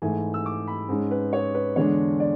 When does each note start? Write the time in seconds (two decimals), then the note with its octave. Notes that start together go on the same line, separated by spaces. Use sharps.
0.02 G#2 E3 A3 G#5
0.34 E6
0.46 D6
0.68 B5
0.89 G#2 G#3 C#4
1.11 B4
1.33 C#5
1.55 B4
1.76 E2 D3 G#3 D4 C#5
2.20 D5